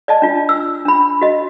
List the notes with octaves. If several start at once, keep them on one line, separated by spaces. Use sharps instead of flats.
D5 D#5 A5
D4 F4
E6
D4 B5
F#4 D#5